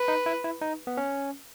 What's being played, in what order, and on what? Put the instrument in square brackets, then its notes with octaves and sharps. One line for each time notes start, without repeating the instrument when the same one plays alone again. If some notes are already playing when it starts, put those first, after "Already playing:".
Already playing: [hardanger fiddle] B4
[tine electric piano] D#4
E4
E4
D#4
B3
C#4